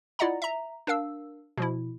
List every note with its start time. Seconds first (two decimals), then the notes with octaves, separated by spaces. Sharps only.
0.19 E4 F4 D5 D#5 F#5 A#5
0.42 E5 A#5
0.87 D4 A#4 F5 E6
1.57 B2 F3 E4